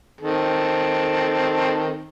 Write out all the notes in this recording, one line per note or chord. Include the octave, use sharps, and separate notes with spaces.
D#3 C4 A4